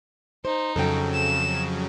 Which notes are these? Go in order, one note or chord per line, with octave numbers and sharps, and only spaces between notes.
D#4 C5
F2 C#3 F#3 A4 G5
E7